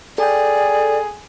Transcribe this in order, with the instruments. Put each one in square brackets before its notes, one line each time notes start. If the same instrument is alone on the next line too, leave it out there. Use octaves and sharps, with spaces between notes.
[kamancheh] G#4 [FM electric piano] A4 G5 [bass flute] D5